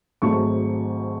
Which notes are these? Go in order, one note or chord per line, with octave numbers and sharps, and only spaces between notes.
G#1 G#2 F#3 A3 A5 C#6